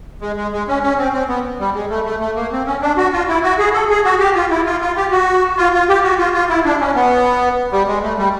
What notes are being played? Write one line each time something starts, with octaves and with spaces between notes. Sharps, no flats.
G#3
G#3
G#3
C#4
C#4
C4
C4
B3
G3
G#3
A3
A3
A3
A#3
C4
C#4
D4
F#4
F4
E4
F#4
G#4
A4
G#4
F#4
G4
F4
E4
F4
F4
G4
F#4
F4
F4
G4
F#4
F4
F4
E4
D4
C#4
B3
G3
G#3
A3
G3